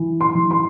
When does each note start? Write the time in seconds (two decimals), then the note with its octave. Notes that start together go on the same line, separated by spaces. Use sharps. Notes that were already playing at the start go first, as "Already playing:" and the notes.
Already playing: E3
0.21 C6
0.35 E3
0.51 C6